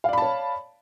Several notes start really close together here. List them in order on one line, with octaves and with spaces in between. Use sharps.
F5 D5 B5 A5 C#5